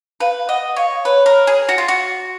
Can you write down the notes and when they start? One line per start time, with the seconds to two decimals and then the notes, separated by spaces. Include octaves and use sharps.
0.20 B4 F5
0.48 D#5 F#5
0.77 C#5 F5
1.05 B4 C#5
1.26 A#4
1.47 G#4
1.69 F#4
1.78 F4
1.88 F#4